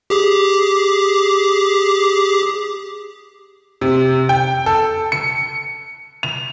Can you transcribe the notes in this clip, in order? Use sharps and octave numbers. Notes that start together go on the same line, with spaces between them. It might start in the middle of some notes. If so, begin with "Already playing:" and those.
G4 G#4 D6
C3
G5
A4
C#7
F7